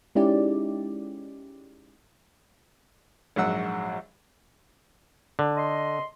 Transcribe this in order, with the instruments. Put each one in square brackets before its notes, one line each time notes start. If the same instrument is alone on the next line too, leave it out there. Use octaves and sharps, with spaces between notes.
[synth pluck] G#3 C#4 D#4 E4 G4 D5
[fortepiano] A#1 G#2 F#3 F#5 E6
[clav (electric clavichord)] D3
[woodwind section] D#5 C6